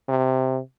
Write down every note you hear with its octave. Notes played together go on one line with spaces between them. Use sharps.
C3